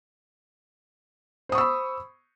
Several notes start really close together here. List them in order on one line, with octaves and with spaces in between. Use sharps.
C5 D#6 C#6 E6 B5